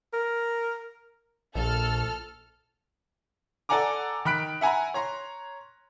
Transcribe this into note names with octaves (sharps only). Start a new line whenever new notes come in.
A#4
A#1 A4 F6
A4 D5 F#5 G#5 A#5 D6
D#3 G5 B5 F#6 B6 D7
E5 F#5 G#5 A#5 B5
C#5 A#5 C6